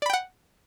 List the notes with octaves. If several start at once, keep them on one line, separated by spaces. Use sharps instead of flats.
D5 F#5 G5 B5